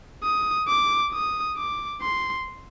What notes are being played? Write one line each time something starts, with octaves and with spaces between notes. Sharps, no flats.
D#6
D6
D#6
D6
C6